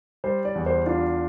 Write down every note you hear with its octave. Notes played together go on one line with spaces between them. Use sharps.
G3 C5
D5
E2
C5
D4 F4